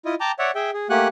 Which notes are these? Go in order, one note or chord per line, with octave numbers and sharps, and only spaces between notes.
E4 F4 D#5
G5 A5 A#5 D6
C#5 D5 E5 F#5
G#4 E5 G5
G#4
A3 A#3 G4 F#5 G#5 F#6